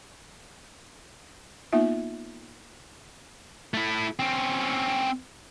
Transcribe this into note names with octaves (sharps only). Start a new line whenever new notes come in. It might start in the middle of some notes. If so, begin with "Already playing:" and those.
A#3 B3 D#4 F4 E5
A3 E4
C4 C#4